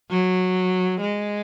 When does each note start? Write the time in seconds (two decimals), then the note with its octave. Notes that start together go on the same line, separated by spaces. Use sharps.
0.11 F#3
1.01 G#3